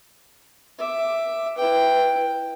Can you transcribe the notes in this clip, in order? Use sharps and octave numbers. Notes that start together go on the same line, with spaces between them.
E5 D6
E4 B4 G5